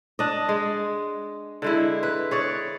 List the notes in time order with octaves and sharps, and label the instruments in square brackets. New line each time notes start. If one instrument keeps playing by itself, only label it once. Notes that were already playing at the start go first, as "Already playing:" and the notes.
[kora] D4 D#5
G#3
D3 G#3 E4
B4
G#4 C#5 D5